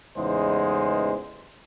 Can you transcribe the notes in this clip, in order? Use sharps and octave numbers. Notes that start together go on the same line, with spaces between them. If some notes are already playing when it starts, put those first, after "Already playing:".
A1 E2 C#3 G#3 D#4 C5